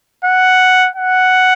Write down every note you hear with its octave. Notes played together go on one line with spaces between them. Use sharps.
F#5
F#5